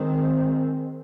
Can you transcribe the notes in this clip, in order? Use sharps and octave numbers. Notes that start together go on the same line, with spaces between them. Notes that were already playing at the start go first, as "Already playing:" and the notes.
Already playing: D#3 G#3 C4